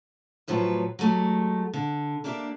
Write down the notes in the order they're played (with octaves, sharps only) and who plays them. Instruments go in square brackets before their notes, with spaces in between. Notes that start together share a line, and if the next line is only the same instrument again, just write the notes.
[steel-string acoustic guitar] D2 A2 F3 F#3 A4 B4
F#3 G#3 A3 G4
D3
A#3 D4 G4 E5